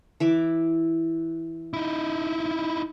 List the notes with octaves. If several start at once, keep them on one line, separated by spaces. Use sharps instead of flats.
E3 E5 D6
D#4 E4